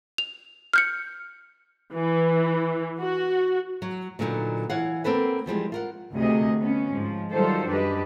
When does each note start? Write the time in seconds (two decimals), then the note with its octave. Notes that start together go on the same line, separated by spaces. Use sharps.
0.18 F7
0.73 F6 G6 C#7
1.94 E3
3.01 F#4
3.82 F#3
4.19 A#2 D3 F#3 G3 B3 D#4
4.70 E3 C#5 F5 F#5
5.04 A#3 C4 A4 B4 F#5
5.46 E3 F3 G3 G#3
5.72 F4 A#4 F#5
6.13 D2 C3 G#4 D#5
6.60 B3 C#4
6.90 G#2 F3
7.31 D#3 F#3 G3 F4 A4 C5
7.67 F#2 G3 D4 G4 B4 D#5